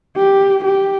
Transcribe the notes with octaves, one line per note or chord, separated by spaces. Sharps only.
G4
G4